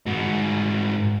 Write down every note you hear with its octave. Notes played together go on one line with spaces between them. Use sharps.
G#2 F#4